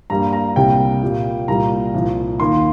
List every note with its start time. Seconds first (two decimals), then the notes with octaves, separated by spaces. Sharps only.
0.10 G2 G3 A#3 A#5
0.33 A#5
0.56 C2 C3 G3 A#3 G5
1.02 A#2 G3 A#3
1.48 C2 A#2 G3 A#3 A#5
1.94 C2 A#2 F3
2.40 D#2 D#3 A#3 C6